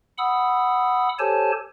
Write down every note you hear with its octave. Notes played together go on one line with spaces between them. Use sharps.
F#5 B5 D#6 E6
G4 A4 C5 C#5 G#5 A5